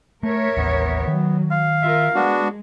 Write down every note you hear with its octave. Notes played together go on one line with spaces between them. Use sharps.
A3 A#4 C#5 E5
A1 D#2 B3
D#3 F#3
F5
F4 A#4 E5
G#3 B3 D4 F#4